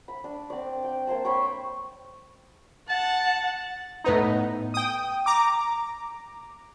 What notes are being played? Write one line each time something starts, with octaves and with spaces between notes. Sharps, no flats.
B5
D4
C4 D5
G5
A#3 C5 A5
C#5 G5 B5 C#6
F#5 A5
A2 B3 D#4
G5 D#6
A#5 D6